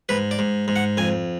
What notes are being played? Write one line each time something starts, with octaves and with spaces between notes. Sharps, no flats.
G#2 B4
D5
G#2
G#2
F#5
F2 G#5